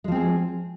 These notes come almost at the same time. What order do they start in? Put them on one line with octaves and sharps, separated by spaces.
G#3 F3 C4 G#4